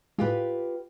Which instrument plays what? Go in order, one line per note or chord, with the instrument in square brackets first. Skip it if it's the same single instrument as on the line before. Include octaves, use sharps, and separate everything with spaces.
[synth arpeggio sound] A2 G#3 [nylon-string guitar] F4 G4 B4